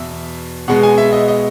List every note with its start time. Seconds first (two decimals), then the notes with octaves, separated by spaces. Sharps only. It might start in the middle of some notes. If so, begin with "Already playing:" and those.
Already playing: E2 B2 E5
0.68 B2 G#3 B3 F#5
0.83 G#5
0.98 E5
1.13 D#5
1.28 D#5